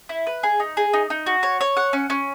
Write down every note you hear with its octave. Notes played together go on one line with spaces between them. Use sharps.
E4
B4
G#4
D#4
G#4
D#4
D#4
F#4
C#5
C#5
F#5
C#4
C#4